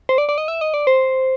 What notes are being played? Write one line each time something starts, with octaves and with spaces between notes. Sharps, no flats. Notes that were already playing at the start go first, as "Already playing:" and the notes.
C5
D5
D5
D#5
E5
D#5
D5
C5